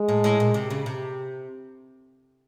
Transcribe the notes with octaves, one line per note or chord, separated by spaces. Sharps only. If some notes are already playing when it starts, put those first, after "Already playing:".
Already playing: G#3
A2
A2
A#2
C3
C#3
C3